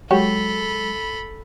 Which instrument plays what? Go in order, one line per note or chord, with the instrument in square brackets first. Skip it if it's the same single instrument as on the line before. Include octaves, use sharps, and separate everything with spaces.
[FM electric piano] F#3 G#3 [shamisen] F#4 G4 C#5 [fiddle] A4 B5